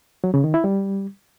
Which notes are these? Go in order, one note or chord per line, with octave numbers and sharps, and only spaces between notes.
F#3
C#3
D#3
E4
G3